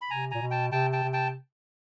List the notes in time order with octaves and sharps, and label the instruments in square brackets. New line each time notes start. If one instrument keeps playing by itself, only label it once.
[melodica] B5
[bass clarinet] C3 [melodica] G#5 A#5
[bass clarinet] A#2 [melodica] G#5 A#5
[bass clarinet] B2
[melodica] G5 A5
[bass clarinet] C3 [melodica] G5 A5
[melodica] G5 A5
[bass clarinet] C3
[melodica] G5 A5